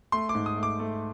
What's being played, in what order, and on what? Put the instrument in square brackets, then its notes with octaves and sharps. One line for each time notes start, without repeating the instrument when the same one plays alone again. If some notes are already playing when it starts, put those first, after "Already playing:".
[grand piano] A3 C6
D6
G#2
D#6
A3
D6
A3